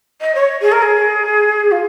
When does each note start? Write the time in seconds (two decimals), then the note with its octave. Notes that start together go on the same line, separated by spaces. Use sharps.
0.21 D#5
0.34 C#5
0.61 G#4
0.71 A#4
0.81 G#4
1.71 F4